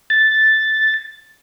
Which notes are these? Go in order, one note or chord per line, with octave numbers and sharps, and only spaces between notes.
A6